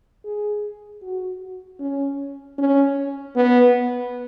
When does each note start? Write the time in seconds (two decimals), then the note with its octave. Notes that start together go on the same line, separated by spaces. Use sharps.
0.24 G#4
1.02 F#4
1.80 C#4
2.58 C#4
3.36 B3